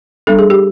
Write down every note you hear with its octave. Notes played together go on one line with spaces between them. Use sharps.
G3 B3 D4 A4
G#4
G4